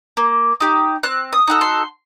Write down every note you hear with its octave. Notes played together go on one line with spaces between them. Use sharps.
A#3
D#4 G4
C4 F#6
D#6
D#4 F#4 A4
C6